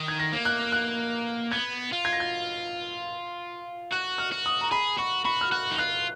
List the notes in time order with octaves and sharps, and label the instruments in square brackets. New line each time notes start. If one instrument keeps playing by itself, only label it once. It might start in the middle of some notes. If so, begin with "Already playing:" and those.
Already playing: [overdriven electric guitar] D#3
[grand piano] G#6
A#6
[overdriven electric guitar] A#3
[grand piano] F#6
F#6
[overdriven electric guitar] B3 [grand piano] G#6
[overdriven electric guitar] F4
[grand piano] G#6
A#6
G#6
[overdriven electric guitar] F#4 [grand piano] F#6
[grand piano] F6
[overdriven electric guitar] F#4
[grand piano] D#6
A#5
[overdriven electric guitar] G#4 [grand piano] B5
[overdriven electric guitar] F#4 [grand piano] C#6
[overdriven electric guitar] F#4 [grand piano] B5
[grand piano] F6
[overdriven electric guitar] F#4 [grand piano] F#6
[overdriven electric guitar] D#4
[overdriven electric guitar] F4 [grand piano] F#6